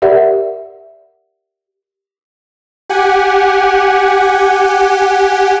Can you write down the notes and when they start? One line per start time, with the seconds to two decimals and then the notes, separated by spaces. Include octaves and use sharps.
0.02 G4 A#4 D5 E5 F#5
2.90 G4 F#5 G#5